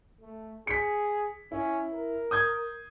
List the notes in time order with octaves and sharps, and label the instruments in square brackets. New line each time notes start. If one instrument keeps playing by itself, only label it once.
[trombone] A3
[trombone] G#4 [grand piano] B6 C#7
[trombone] C#4 [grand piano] E4
[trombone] A#4
[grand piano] D#6 G6 G#6